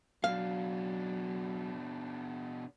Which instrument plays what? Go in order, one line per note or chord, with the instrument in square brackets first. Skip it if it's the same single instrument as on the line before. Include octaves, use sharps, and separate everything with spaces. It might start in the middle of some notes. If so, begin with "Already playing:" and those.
[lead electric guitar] B2 D4 [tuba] F#3 [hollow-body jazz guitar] F5